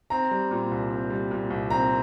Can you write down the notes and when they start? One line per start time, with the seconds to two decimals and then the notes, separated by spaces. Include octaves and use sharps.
0.10 C4 A#5
0.31 G3
0.51 A#2
0.71 C2
0.91 C4
1.10 G3
1.31 A#2
1.50 C2
1.70 C4 A#5